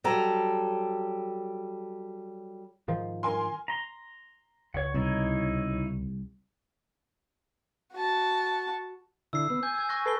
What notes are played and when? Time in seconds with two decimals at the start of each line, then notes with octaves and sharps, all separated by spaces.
0.04 F#3 G3 A4 A#5
2.88 G#2 D#3 F3
3.23 A#4 G#5 C6
3.68 A#5 C6
4.74 C#2 C#5 F#5
4.94 C2 D#4 E4 C#5
7.93 F#4 A5
9.33 D3 E4 E6 C7
9.50 B3
9.63 G#5 G6
9.74 E6 G#6
9.89 C#6 F#6 A#6
10.06 A4 B4 G#5 C7 G7